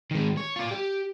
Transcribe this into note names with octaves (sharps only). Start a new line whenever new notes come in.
D#3 G#3
C#5
F4 D5
G4